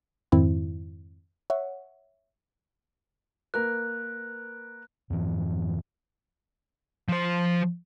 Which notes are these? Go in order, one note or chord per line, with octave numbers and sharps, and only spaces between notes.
F2 G#2 D#3 C4 E4
C#5 E5 F#5
A#3 A#4 B4 F#6
F2 G#2 E3 C4
F3 C5